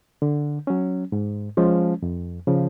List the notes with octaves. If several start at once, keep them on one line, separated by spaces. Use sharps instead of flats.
D3
F#3 C#4
G#2
F3 G#3 C#4
F2
C#3 F3